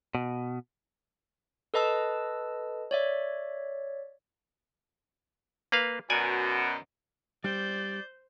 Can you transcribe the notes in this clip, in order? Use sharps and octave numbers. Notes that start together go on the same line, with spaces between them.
B2
A4 B4 D#5 A5 E6
C#5 D5 E5
A#3 B4 F5
F#2 B2 D5 G#5
G3 C5 D5 G6